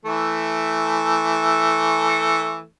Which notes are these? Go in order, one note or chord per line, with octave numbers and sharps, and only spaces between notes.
E3 A3